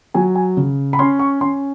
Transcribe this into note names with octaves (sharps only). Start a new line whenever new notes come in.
F#3 G#5
G#5
C#3
B5
C#4 C6
C#6
C#4 C6